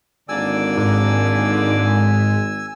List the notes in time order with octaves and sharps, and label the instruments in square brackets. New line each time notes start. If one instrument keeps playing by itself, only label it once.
[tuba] G#1 [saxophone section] D3 A#3 D5 [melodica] G#5 E6
[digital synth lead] G#2